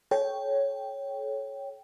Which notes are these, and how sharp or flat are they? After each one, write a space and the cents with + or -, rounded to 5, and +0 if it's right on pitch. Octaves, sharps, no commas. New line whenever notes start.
A4 -40 C#5 +0 G5 +0